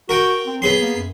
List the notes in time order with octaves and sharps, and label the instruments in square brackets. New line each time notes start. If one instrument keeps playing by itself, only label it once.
[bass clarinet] F#4 [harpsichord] A#4 G5
[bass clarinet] C4
[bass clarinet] F#3 [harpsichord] B3 G#4 C6
[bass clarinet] A#3
F#2